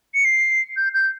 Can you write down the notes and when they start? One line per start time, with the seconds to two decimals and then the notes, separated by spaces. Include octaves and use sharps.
0.14 C#7
0.25 C7
0.77 G6
0.94 G6